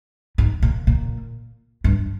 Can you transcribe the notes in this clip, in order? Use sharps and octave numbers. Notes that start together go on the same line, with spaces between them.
G#2
A#2
A#2
G2